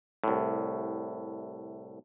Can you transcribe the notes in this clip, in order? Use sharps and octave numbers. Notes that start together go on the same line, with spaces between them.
C2 A2